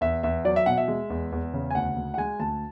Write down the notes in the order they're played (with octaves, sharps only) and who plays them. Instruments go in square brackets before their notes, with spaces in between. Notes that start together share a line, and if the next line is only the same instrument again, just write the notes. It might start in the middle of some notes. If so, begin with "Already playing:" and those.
[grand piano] E2 E5
E2 E5
F#3 D5
E5
B2 F#5
E5
G#3
E2
E2
C#3
G#5
D2 F#5
D2
F#5
G#3 G#5
D2 A5